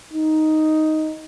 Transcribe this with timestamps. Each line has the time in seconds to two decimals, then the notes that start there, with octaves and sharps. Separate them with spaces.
0.13 D#4